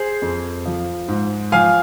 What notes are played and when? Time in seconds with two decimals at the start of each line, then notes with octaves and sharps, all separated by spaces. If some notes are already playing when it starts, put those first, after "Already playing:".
Already playing: G#4 C5
0.22 F2
0.65 F3
1.08 G#2
1.52 F3 F5 G#5